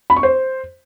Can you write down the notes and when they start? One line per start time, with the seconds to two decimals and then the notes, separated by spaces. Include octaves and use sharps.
0.10 B5
0.16 C#6
0.23 C5